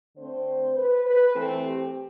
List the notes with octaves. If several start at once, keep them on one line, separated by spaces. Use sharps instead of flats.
D3 A3 C4 C5
B4
B4
E3 A3 C4 A4
G4